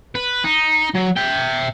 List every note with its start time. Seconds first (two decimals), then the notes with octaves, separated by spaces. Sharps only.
0.15 B4
0.44 D#4
0.94 F#3
1.16 E5 G5